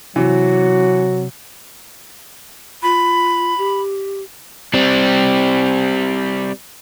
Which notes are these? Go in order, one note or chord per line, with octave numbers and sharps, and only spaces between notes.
C3 E3 F#3 F#4
F4 B5
G4
G3 C4